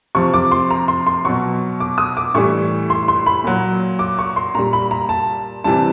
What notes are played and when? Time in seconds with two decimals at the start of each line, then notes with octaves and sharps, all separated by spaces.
0.15 C3 F3 C#6
0.34 D6
0.52 C6
0.70 A#5
0.88 C6
1.06 C6
1.25 B2 F#3 C#6
1.80 D6
1.98 D#6
2.17 D6
2.34 A2 E3 G3 C#6
2.90 C6
3.08 C6
3.26 B5
3.44 A#2 F#3
3.99 D6
4.19 C#6
4.36 C6
4.55 A#2 G3 A#5
4.73 B5
4.91 A#5
5.09 A5
5.64 C3 E3 G3 A5